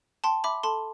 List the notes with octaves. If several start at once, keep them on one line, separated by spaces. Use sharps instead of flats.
G5 A5 C6
E5 B5 D6
A4 A5 C6